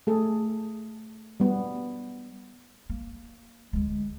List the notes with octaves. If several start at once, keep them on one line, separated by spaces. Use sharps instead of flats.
A3 G#4 A4
G3 B3
A#3
D2 G#3